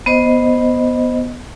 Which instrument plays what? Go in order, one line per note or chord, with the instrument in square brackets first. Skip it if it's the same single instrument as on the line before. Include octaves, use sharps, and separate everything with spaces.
[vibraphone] B3 C5 D#5